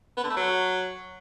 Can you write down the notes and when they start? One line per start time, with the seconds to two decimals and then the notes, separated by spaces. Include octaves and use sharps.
0.17 B3
0.23 D3
0.30 A3
0.36 F#3